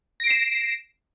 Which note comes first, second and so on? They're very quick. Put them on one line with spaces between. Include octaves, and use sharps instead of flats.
A#6 D7 C7 E7